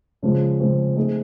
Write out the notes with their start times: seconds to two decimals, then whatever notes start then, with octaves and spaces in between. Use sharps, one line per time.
0.22 C#3 F3 G#3 C4
0.60 C#3 F3 G#3 C4
0.96 A3 C4 D#4 G#4